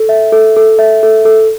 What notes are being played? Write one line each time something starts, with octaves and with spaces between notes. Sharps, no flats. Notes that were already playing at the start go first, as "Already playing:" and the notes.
Already playing: A4
E5
A4
A4
E5
A4
A4